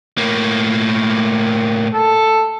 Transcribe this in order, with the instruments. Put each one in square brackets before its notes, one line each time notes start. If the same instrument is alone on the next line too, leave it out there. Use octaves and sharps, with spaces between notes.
[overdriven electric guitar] A2 A#3
[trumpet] A4